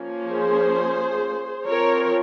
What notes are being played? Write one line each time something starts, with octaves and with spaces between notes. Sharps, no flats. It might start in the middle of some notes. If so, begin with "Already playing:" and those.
Already playing: F3 A#3 C#4
G#4 C5
F3 C4 A#4 C#5